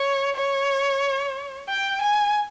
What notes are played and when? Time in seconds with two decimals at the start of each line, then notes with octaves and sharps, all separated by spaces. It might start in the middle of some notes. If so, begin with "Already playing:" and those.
Already playing: C#5
0.36 C#5
1.69 G5
2.01 G#5